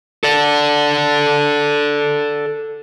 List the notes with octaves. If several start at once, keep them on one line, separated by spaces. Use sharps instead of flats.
A4 D5